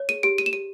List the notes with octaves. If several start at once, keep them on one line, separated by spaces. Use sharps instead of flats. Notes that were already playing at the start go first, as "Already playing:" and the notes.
Already playing: C#5
G#4 D#7
G4 D7
G4 D#7
E7
G4 D#7